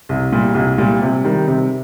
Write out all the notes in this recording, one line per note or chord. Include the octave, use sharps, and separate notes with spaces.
C2
A#2 G3
C2
A#2 G3
C3
D#3 G3
C3